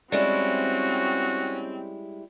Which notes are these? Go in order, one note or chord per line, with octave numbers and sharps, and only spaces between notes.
G3 G#3 C4 C#4 E4 F#4